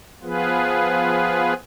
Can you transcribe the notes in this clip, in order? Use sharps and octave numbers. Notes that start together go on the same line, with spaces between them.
F3 B3 F4 G#4 B4